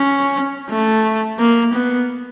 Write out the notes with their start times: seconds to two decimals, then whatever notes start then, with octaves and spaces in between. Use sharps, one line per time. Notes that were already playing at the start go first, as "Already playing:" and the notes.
Already playing: C#4
0.70 A3
1.39 A#3
1.73 B3